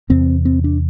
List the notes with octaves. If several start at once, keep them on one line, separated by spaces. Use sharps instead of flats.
E2 C3 C4
C4
D4